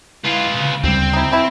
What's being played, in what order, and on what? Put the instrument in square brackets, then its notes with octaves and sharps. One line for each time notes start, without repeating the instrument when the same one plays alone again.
[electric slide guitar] G#3 E4 F5 [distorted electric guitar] F4 B4
[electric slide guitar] A#2 C#3
[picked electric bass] D2 G3 [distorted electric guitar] C4
[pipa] D#4 E4
B2 E4